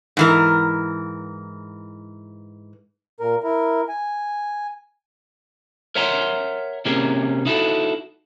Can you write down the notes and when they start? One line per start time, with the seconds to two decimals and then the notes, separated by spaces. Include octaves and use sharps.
0.17 G#2 E3 A#4
3.20 A#2 A#4
3.43 E4 A#4
3.89 G#5
5.95 A#4 C#5 E5 F#5 A#5 C6
6.85 C3 A#3 C#4 G4 G#4 A#4
7.46 D#4 E4 F#4 A4